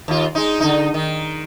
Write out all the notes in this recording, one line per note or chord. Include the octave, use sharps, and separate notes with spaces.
D#2 F4
G#3 D#4
D3 D#4
D#3